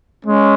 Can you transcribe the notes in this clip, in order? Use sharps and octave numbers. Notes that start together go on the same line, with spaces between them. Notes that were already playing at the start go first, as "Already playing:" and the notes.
G#3 C#4